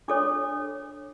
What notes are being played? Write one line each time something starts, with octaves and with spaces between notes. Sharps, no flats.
D4 A4 C#5 D6